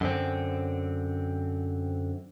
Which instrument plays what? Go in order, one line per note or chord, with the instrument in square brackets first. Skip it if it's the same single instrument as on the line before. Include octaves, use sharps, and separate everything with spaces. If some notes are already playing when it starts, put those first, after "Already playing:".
[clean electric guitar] F#2 D3 C4